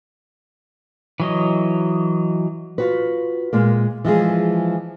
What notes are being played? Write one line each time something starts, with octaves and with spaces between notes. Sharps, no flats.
E3 F#3 D#5
F4 F#4 B4
A#2 G#3 A#3
E3 F3 G#3 G#4